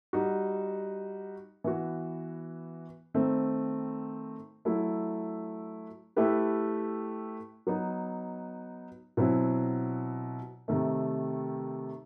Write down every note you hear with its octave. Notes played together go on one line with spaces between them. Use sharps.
G3 D#4 F#4
E3 B3 F#4
D#3 A3 C4
F#3 A3 E4
A3 E4 G4 B4
F#3 B3 D#4
B2 F#3 C4 E4
C3 D#3 A3